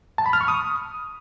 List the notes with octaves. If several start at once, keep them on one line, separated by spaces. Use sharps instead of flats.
A5
B5
F6
C#6
D#6